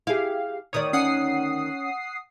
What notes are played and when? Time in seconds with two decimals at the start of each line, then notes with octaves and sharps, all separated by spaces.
0.07 E4 G4 G#4 F5
0.73 D2 D#3 C#5 D5 D#6
0.93 C#4 F#5 D#6 C7